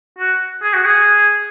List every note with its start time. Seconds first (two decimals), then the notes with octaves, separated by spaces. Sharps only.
0.19 F#4
0.63 G#4
0.74 F#4
0.85 G#4